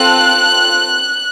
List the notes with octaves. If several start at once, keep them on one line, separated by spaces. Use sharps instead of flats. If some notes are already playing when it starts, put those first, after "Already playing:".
Already playing: C4 F4 A4 F#6